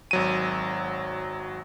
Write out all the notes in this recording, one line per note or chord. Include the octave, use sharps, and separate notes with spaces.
G#1 F#3 D#7